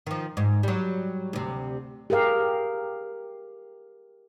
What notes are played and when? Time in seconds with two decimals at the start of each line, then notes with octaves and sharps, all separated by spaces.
0.07 D#3 F3
0.37 G#2
0.63 F#3 G3
1.33 D2 C3
2.10 G4 G#4 A#4 F5